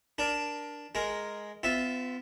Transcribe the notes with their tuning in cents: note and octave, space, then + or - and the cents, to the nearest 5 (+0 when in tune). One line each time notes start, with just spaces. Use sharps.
D4 +0 A#4 +20
G#3 +5 A#4 +0
B3 +40 F4 +0 E5 -5